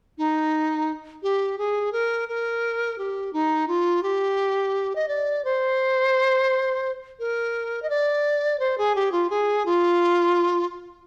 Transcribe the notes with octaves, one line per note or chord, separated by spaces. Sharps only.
D#4
G4
G#4
A#4
A#4
G4
D#4
F4
G4
D#5
D5
C5
A#4
D#5
D5
C5
G#4
G4
F4
G#4
F4